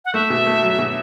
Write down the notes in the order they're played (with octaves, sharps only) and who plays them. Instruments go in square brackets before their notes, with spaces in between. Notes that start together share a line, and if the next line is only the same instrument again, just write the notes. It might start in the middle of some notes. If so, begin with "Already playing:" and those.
[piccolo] F#5
[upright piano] A3 [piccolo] E5
[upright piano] B2
A3
F#3
B2